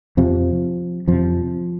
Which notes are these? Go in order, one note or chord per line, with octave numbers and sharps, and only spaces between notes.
F2 C3 F3
F2 C3 F3